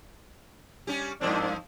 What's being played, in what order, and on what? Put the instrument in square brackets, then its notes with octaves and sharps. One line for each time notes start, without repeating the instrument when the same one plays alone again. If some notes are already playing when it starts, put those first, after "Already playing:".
[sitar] G3 C#4 G4
[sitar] G2 F3 C4 [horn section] D#3 D4